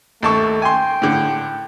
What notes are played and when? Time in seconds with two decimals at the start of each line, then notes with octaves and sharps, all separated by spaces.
0.23 D#2 A3 A5 C#6
0.62 G5 G#5 C6
1.02 A2 D3